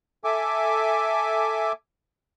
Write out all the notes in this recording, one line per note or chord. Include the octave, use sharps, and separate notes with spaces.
A4 E5 G#5 D6